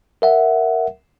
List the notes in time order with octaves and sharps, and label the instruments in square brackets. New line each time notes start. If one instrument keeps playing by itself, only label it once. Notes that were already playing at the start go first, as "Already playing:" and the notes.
[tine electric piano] A#4 E5 F#5